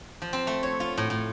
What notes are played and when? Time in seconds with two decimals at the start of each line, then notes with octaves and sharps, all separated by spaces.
0.22 F3
0.33 C4
0.47 A3
0.63 C#5
0.80 F4
0.98 A2
1.10 A2